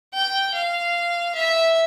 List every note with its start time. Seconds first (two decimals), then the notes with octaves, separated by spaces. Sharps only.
0.14 G5
0.54 F5
1.35 E5